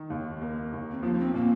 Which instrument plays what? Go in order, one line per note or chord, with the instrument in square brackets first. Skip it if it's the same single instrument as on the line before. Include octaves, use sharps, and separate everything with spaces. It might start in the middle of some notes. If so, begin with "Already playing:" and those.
Already playing: [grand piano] D#3
D#2
A#3
D#2
[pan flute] C4
[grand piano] F3 [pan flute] A#3
[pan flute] D#4
C4
[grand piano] A#2 [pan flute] A#3